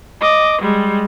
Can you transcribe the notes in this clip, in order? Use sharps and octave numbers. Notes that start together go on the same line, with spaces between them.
D#5 D6
G3 G#3